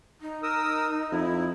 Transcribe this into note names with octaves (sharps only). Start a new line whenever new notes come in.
D#4
A#4 D#6 E6
F2 E4